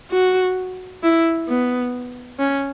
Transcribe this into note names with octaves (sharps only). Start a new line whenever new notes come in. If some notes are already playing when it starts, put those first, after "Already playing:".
F#4
E4
B3
C#4